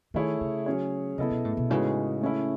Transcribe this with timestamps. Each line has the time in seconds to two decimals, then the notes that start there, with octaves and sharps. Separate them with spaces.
0.14 D#3 A3 E4 G#4 C#5
0.41 C#3
0.66 F#3 C#4 G#4 C#5
1.18 C#3 B3 E4 A4 D#5
1.31 B2
1.45 A2
1.57 B2
1.70 A2 C#3 G#3 D#4 F#4 B4
2.21 A3 C#4 E4